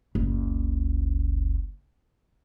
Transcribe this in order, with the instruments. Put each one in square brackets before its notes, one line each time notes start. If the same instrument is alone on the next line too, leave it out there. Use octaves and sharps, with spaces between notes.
[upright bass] F#1 C#2